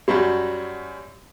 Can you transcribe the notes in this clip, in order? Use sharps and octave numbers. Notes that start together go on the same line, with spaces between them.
F#2 F#3 G3